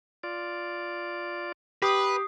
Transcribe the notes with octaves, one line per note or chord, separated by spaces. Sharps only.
F4 D5
G4 B4 D#6 C7